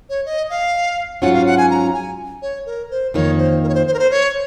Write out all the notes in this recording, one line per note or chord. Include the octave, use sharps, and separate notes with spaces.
C#5
D#5
F5
G#2 F#3 C#4 F4 F#5
F5
F#5
G#5
A#5
G#5
C#5
A#4
C5
F2 D#3 A#3 C#5
C5
A#4
C#5
C5
C5
A#4
C5
C#5